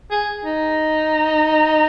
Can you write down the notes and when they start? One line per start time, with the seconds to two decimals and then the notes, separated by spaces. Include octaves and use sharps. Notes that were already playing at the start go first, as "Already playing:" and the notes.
0.11 G#4
0.45 D#4